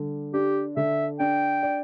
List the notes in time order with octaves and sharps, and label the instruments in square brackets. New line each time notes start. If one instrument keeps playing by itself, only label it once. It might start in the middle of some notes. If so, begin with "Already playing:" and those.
Already playing: [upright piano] D3 G3
[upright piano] D4 [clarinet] G4
[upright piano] D3 [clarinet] E5
[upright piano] D4 [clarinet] G5
[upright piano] D5